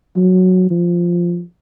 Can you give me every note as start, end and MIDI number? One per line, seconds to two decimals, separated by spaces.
0.16 0.69 54
0.71 1.41 53